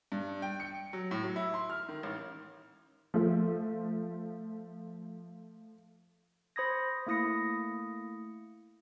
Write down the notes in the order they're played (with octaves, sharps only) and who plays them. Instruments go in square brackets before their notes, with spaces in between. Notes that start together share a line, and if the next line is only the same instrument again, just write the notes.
[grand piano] G2
G5
C#7
F#3
A2
F#3
E4
C6
F6
D#3
A1
[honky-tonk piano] F3 A3
[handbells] C5 B5 D#6 G#6 A#6
A3 A#3 E4 D#6 A#6 C#7